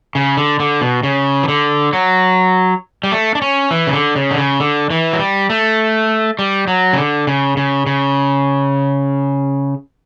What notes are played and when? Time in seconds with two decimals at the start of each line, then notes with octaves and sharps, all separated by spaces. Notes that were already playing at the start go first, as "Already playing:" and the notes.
0.15 C#3
0.37 D3
0.60 D3
0.81 B2
1.03 C#3
1.43 E3
1.48 D3
1.93 F#3
3.04 G3
3.12 A3
3.35 D4
3.42 C#4
3.71 E3
3.87 C#3
3.93 D3
4.16 C#3
4.31 D3
4.38 C#3
4.60 D3
4.90 E3
5.13 F#3
5.19 G3
5.50 A3
6.39 G3
6.68 F#3
6.93 C#3
6.98 D3
7.27 C#3
7.57 C#3
7.87 C#3